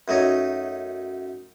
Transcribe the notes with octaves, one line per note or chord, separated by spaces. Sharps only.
F#2 A3 D#4 C#5